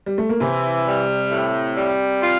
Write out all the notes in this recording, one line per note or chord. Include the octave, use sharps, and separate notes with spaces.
G3
A3
A#3
C3 E3 C4
G3
A2
G3
F4